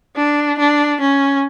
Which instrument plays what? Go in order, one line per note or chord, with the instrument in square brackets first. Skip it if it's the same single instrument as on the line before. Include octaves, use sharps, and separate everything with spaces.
[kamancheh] D4
D4
C#4